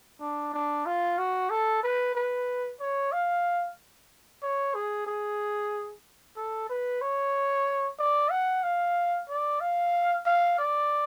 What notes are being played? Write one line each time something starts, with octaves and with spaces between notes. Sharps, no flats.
D4
D4
F4
F#4
A4
B4
B4
C#5
F5
C#5
G#4
G#4
A4
B4
C#5
D5
F#5
F5
D5
F5
F5
D5